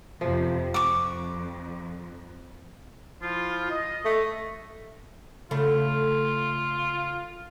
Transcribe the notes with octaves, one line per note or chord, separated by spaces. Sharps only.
F2 C3 F3
F2 C#6 D6
F3 E4 F4
D#5
A3
C#3 A3 F4 B5